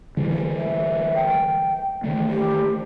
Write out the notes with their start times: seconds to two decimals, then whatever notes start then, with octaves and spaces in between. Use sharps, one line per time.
0.17 D3 E3 G3
0.56 E5
1.14 G5
2.04 D#3 E3 A3
2.29 G4